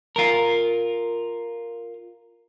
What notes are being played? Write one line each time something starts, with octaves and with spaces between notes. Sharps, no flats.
F4 A#4